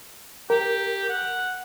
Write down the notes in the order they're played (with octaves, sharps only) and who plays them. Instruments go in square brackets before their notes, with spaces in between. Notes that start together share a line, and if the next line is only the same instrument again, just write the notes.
[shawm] G4 [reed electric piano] A#4
[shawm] F#5